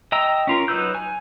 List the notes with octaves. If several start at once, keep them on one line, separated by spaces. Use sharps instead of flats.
D#5 G5 A#5 E6
C#4 F4 A#4
F#3 D#4 B4 E6 G6
G#5